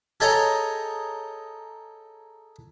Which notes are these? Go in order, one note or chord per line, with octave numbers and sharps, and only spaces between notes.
G#4 A4 C#5 D#5 G5 A#5